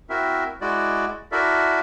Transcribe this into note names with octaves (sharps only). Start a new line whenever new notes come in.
C4 E4 F#4 A#4 E5
G#3 E4 F#4 D5
E4 F#4 A4 A#4 D5 E5